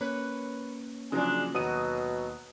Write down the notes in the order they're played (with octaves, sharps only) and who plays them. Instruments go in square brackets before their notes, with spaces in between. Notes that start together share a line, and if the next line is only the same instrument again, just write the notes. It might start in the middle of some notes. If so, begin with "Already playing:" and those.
[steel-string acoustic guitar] A#3 C#4 C#5 [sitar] B4
[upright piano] C#3 F3 F#3 [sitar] G#3 D4
[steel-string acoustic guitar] D#2 F#5 [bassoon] B2 [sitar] F#3 [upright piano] D#6 D#7